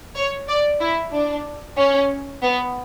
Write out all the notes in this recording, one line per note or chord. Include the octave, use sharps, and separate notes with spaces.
C#5
D5
E4
D4
C#4
B3